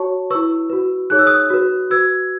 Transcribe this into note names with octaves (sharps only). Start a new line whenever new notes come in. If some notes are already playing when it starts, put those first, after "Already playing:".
Already playing: F#4 C#5 A5 C#6
E4 B4 C#6 E6
F#4 B4
D#4 G#4 C#5 F#6
E6
D#6 F#6
F#4 B4
F#4 B4 E6 G#6